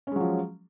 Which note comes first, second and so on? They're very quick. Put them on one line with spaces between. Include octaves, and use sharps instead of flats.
C#4 G#3 F#3 F3